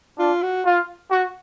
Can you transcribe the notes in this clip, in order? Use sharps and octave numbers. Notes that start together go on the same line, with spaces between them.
D4 F4
F#4
F4
F#4